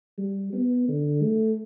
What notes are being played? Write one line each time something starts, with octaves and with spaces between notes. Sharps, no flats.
G3
B3
D3
A3